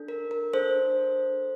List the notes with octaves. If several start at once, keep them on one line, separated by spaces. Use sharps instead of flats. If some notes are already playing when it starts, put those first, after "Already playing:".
Already playing: D4 A4
A#4
A#4
D4 A4 C5